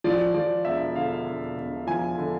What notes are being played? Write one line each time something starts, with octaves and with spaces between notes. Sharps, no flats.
F3 D5
F3 D5
E1 E5
D3 F5
E1
E1
F3 G#5
D3